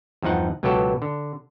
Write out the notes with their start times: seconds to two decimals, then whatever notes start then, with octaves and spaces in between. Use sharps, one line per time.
0.22 E2 G2 F3 D#4 F#5
0.63 C#2 B2 F#3 B3 G4 A4
1.02 D3